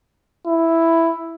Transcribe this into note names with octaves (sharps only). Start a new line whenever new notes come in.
E4